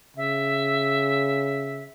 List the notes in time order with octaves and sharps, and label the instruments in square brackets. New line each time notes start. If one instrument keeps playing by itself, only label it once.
[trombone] C#3 [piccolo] E5